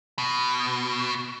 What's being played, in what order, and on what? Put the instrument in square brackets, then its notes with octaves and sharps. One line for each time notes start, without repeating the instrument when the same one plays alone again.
[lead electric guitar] B2